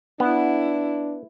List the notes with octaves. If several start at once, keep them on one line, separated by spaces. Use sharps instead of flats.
B3 D4 E4